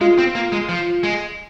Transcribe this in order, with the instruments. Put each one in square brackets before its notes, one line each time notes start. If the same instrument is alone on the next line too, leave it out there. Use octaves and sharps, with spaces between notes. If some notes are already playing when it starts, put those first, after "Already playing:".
[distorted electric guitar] G#3 [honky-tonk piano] F4
[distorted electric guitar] C4
A#3
G#3
F3
G#3